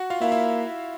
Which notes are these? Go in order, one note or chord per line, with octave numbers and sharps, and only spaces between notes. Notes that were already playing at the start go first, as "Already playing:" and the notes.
Already playing: F#4 F#5
F4 F5
A#3 E4 E5
E4 E5